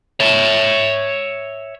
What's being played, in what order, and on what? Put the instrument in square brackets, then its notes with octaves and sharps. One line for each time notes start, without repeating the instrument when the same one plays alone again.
[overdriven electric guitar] C#5 E5